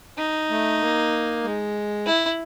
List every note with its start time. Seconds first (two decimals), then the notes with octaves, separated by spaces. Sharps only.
0.18 D#4
0.50 A3
0.81 A#3
1.44 G#3
2.06 E4